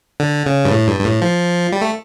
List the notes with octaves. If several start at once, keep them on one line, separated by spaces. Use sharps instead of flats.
D3
C#3
G2
A2
G2
G2
A2
F3
G3
A3